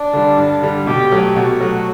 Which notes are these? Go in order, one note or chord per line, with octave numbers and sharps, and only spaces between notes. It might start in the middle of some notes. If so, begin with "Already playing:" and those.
Already playing: D4
D3 G3
G2
D3 G3
B2 G4
F#3 A3
B2 F#4
F#3 A3